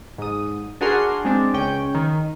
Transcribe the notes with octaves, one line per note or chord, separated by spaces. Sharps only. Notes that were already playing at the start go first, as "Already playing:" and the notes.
G#2 D#6
D4 F#4 G#4 A#4 C6
G#3 C4 D4
C#2 C#4 G5
D#3